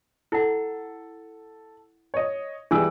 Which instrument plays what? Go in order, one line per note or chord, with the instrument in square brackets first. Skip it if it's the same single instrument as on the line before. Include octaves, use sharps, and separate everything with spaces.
[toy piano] E4 F#5 [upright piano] A4
[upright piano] C#5 D#5
[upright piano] E3 G3 [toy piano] G#4 G#5 E6